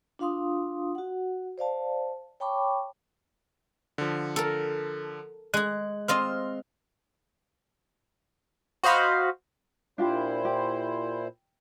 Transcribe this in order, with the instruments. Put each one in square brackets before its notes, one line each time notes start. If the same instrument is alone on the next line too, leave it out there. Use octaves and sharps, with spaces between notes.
[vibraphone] D4 F4 F5 C6 D#6
F#4 F#5
C5 D5 F5 A5
C#5 G5 A5 B5 C#6 D6
[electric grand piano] D3 F3
[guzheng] A4 A#4
[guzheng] G#3 G#4 [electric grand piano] F#6
[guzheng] C4 F4 D#5 [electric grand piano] C6 F6
[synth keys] F#4 C5 D#5 F5 B5
[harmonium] A#2 E4 C5 [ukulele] D4 F4 G4
[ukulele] G4